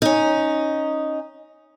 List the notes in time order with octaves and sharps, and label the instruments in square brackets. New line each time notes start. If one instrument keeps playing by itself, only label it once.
[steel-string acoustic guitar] C#4 D#4